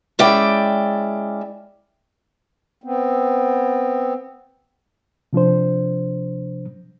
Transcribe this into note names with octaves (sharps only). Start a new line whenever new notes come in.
G#3 C#4 E4 D5 G5
B3 C4
C3 F3 D4 C5